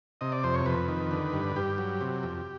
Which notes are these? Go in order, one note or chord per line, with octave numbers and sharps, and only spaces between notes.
C3 D#5
D5
F2 C5
C#5
F2 B4
D#3
D3
G2
G2 G4
F#3
C3
F2